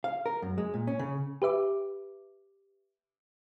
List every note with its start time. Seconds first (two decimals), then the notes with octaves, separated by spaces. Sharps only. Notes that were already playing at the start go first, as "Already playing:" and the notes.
0.04 F5
0.26 A#4
0.42 F#2
0.58 G#3
0.74 A#2
0.87 C#4
0.99 C#3
1.42 G4 B4 E5 D6